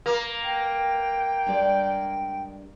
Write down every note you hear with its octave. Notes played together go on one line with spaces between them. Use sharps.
A#3 B4
G5
G2 G#3 D5